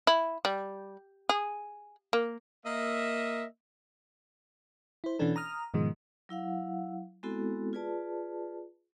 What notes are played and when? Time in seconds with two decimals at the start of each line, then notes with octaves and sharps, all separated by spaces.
0.07 E4
0.45 G3
1.29 G#4
2.13 A#3
2.64 A#3 D#5 E5
5.04 E4 C5
5.19 B2 E3 B3 C#4 D4 A4
5.36 A#5 D#6 F6
5.74 G#2 B2 D#3 F3 G#3
6.29 F#3 E4 F5 F#5
7.23 G#3 B3 C4 E4 F#4 A4
7.73 F4 G#4 B4 D5 A5